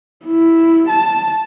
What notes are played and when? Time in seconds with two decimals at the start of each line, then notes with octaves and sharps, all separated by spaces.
0.25 E4
0.89 A5